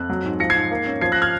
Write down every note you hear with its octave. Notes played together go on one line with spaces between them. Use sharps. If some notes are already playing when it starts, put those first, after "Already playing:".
Already playing: F2 F#6
F#3
G#2
F3 A#6 C#7
G#6 C7
G#2
A#3
C#4
F3 G#6 C7
F#6 A#6
F6 G#6